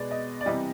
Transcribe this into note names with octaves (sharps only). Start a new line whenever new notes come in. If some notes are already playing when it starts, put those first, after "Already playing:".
Already playing: B2 G#3 B3 D5
D#5
D5
C3 E3 G3 D#5